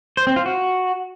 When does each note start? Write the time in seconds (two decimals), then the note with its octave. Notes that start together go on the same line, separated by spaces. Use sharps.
0.17 C5
0.27 C4
0.36 F4
0.46 F#4